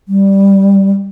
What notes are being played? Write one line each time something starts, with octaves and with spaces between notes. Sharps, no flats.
G3